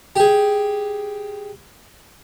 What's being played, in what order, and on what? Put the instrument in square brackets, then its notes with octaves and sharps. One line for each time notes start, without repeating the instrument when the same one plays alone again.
[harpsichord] G4 G#4